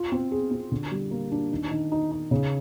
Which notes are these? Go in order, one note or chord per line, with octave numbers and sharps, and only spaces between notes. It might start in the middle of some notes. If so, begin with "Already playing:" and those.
Already playing: F4
C4
G#4
C4
D3
G3
A#3
D4
D#3
D#3
D#4
D#4
C#3